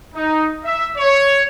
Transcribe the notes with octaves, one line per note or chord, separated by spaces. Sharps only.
D#4
E5
C#5